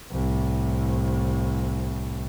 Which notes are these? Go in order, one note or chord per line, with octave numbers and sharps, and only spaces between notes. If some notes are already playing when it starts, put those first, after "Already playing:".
C2 A2